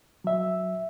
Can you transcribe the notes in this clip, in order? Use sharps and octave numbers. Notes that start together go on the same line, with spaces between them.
F#3 E5